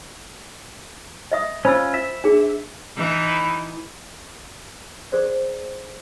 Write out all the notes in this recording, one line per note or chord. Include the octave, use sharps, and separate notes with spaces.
D#5 E5 D#6
C#4 F4 C5 B5 E6
E5
D4 G#4
E3 D#4 E4
G#4 C5 D5